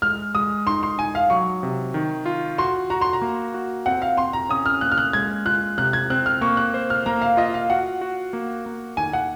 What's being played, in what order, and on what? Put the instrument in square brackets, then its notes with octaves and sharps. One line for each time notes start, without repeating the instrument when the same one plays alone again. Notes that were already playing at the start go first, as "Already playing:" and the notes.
[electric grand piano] G#3 [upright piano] F6
[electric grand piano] G#3 [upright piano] D#6
[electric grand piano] D#4 [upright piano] C6
[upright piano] C6
[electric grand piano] D#4 [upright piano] G#5
[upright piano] F5
[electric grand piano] F#3 [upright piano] C#6
[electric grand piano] C3
D#3
F4
[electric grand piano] F#4 [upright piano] C6
[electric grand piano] F#4 [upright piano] A#5
[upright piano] C6
A#5
[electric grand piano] A#3
F#4
[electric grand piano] C4 [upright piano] F#5
[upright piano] F5
[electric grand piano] C4 [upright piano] C6
[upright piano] A#5
[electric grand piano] C#4 [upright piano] D#6
[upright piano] F6
[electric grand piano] A#3 [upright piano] F#6
[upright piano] F6
F#6
[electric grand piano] G#3 [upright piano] G#6
[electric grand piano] F4 [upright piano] F#6
[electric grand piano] C3 [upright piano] F#6
[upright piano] G#6
[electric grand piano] C4 [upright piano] F#6
[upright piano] F6
[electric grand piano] A#3 [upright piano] C#6
[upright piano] F#6
[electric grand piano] C5
[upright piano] F6
[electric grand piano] A#3 [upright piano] A#5
[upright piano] F5
[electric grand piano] F4 [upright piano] D#5
[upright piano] F5
[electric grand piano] F#4 [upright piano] F#5
[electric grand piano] F#4
A#3
A#3
[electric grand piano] D#3 [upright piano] G#5
[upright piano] F#5